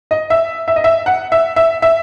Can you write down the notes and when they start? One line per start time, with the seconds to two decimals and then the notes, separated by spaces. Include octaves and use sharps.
0.11 D#5
0.30 E5
0.68 E5
0.76 D#5
0.84 E5
1.06 F#5
1.32 E5
1.56 E5
1.82 E5